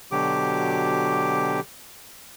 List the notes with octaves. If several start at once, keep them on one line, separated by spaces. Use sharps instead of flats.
B2 D3 F#3 G4 D6